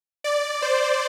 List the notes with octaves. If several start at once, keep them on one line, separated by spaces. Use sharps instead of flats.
D5
C5